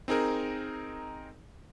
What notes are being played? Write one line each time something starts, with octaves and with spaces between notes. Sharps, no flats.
C4 D#4 G#4 A#4